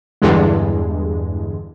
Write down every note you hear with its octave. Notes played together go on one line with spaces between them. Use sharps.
E2 G2 D3 G#3